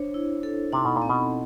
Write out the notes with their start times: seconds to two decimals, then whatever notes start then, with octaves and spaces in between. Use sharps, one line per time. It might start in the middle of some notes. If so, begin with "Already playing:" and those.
Already playing: D4 C5 C#5
0.14 E4
0.43 A4
0.72 C3 D#4
0.85 B2
0.96 A#2
1.02 C4
1.09 B2